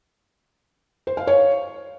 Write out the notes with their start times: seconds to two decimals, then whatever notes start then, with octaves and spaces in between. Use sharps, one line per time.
1.07 C5
1.17 F5
1.27 C#5